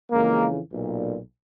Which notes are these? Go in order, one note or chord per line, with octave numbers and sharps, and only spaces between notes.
F2 C#3 E3 G#3 A#3
B1 A#2